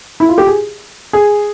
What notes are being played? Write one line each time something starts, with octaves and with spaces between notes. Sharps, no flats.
E4
F4
G4
G#4
G#4